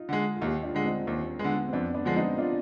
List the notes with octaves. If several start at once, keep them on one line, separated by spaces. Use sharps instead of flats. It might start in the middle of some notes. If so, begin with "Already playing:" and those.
Already playing: D#4 F4
D3 G#3
F4
D#2 D#4 G4
D4 F4
D3 G#3
C4 D#4
D#2 C4
D3 G#3 B3
C4
F2 B3 D4
B3 D4
D3 F3 G#3
C4 D#4
D4 F4